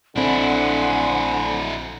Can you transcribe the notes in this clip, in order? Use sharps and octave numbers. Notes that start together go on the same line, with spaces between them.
A#1 D3 C4 D4 E4 C5 F#5 G#5